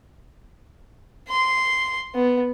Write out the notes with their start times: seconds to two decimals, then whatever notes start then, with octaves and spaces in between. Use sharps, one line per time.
1.29 C6
2.14 B3